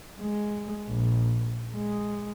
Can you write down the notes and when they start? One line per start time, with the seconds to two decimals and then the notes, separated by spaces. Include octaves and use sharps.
0.21 G#3
0.89 A#1
1.74 G#3